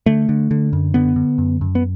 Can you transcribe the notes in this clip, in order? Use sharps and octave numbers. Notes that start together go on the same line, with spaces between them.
D3 A3
D3
D3
F#2
D3 B3
D3
F#2
F#2
B3